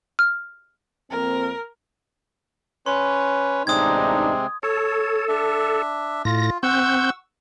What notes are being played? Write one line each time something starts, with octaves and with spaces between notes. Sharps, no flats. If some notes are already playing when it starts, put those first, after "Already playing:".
F6
F2 A#3 C4 A#4
C#4 B4 C#5 C6
A1 C3 G#3 C4 D4 D#4 D#6 G#6
A4 C#5
D4 E5
A2 F4 A#6
C4 F#5 C#6 E6 G6